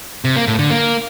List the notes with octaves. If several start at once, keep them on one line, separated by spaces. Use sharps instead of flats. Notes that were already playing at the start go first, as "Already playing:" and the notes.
C3
A#3
A2
D3
A#3